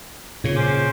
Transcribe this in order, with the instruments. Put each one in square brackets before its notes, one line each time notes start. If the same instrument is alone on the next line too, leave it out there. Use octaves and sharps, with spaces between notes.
[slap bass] A#2 C#3 [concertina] C#5
[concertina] C#4 C5 D6